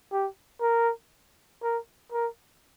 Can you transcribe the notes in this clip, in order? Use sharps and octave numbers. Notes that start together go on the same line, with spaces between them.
G4
A#4
A#4
A#4